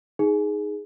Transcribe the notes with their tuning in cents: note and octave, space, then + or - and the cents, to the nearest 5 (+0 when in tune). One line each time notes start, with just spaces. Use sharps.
D#4 +0 G#4 +0